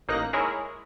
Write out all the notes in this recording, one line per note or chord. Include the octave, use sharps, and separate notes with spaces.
A1 A#3 D#4 F#6 A#6
G#3 E4 G#4 A#4 C#5